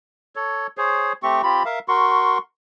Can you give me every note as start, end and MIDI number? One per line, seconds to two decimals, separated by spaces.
0.36 0.67 69
0.36 0.67 73
0.77 1.13 68
0.77 1.13 72
0.77 1.13 73
1.23 1.42 57
1.23 1.42 60
1.23 1.42 67
1.23 1.42 85
1.43 1.63 60
1.43 1.63 65
1.43 1.63 67
1.43 1.63 83
1.65 1.79 70
1.65 1.79 76
1.65 1.79 77
1.88 2.38 66
1.88 2.38 70
1.88 2.38 84
1.88 2.38 85